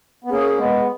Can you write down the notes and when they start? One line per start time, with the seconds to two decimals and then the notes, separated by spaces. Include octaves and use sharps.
0.24 B3
0.30 A#3 C#4 G#4
0.57 G#3 B3